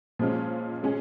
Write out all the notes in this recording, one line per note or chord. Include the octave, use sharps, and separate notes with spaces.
A#2 F3 G#3 C#4 F4
G#3 C#4 G#4